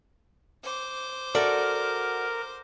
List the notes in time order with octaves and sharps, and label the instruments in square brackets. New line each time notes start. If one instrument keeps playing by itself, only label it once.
[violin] C5 D6
[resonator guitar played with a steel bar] F#4 D5 [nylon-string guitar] A4 [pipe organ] A#4